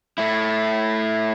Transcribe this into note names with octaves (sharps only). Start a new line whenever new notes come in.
A3 E4